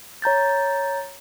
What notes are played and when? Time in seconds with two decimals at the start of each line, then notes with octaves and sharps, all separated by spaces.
0.22 C#5 A#5 G6 A6